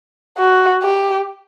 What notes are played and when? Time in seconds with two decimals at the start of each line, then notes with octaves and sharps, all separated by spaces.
0.38 F#4
0.83 G4